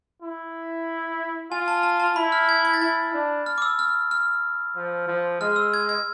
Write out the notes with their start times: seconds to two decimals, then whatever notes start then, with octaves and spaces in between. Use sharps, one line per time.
0.22 E4
1.51 F4 G#5
1.68 A5
1.83 A5
2.00 A5
2.16 E4 B5
2.32 F6
2.49 G#6
2.65 G#6
2.74 A6
2.81 E4 G#6
3.14 D4
3.46 F6
3.58 D6
3.62 E6
3.79 F6
4.11 F6
4.76 F3
5.07 F3
5.40 G#3 F6
5.56 E6
5.74 G#6
5.89 G#6